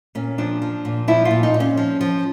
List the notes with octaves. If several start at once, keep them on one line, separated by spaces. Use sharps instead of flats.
A#2 C#4
F3 D4
F3
A#2
F3 E4
F4
A#2
D#4
A#2
C#4
F3
F3